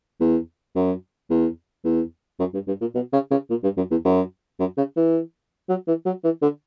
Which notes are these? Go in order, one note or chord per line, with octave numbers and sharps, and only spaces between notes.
E2
F#2
E2
E2
F#2
G2
G2
A#2
B2
C#3
C#3
A#2
G2
F#2
E2
F#2
F#2
C#3
E3
F#3
E3
F#3
E3
D3